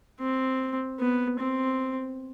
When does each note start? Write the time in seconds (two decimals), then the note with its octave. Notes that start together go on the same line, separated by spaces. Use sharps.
0.20 C4
1.00 B3
1.39 C4